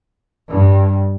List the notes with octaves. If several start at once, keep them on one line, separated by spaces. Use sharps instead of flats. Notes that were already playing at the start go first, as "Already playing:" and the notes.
G2